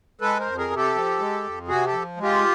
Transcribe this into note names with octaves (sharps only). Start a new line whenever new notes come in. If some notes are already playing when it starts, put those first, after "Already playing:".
G#3 A4 B4
A#4 C5
F2
G#4 A#4
C3
G4 A4
F3
G#3
F2
C3 F#4 G#4
G4 A4
F3
G#3
F4 G4